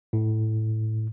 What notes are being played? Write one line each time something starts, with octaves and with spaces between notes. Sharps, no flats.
A2